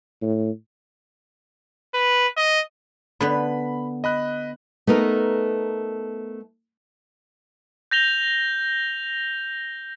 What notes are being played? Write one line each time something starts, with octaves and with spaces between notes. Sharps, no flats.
A2
B4
D#5
D3 B3 B4 B5
D#5 B5 F#6
A3 B3 D#4 A#4
G6 A#6 F7 G7